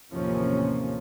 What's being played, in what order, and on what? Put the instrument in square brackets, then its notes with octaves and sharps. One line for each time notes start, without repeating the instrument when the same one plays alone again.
[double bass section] A1 D#2 C3 F3 A#3 C#4